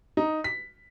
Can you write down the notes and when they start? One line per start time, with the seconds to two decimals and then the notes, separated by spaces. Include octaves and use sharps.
0.17 D#4
0.44 B6